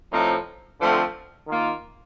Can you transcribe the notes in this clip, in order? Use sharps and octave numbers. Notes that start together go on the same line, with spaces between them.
A2 F3 C4 D#4
D3 F3 A3 C4
D#3 A#3 F4